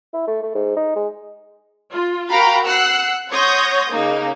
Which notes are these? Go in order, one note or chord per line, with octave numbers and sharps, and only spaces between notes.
E4
A3
A3
G#2
D#4
G#3
F4
F#4 A#4 F5 G5 A#5 B5
F#5 E6 F#6 C7
C#5 F#5 C6 D#6 G6 A#6
C#3 A#3 D#4